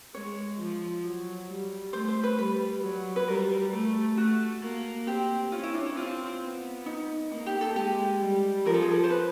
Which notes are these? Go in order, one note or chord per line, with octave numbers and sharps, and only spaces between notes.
G#3 C#5
F3
F#3
G3
A3 C5
C5
B4
G3 B4
F#3
B4
G3 A#4
A3
A3 F#4
A#3
C4 G4
C#4 F4
E4
D4
E4
C4 F4
B3
D#4
A#3 D#4
G4
A4
G#3 G4
G3
F3 A#4
A4
G#4
A4
C5
B4